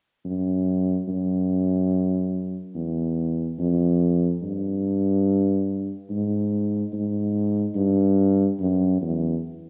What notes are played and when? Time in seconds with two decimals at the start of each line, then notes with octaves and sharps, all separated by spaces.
0.25 F#2
1.08 F#2
2.75 E2
3.59 F2
4.42 G2
6.09 G#2
6.93 G#2
7.75 G2
8.60 F#2
9.01 E2